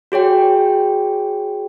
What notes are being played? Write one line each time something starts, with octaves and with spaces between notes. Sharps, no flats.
F#4 G#4 C#5 G5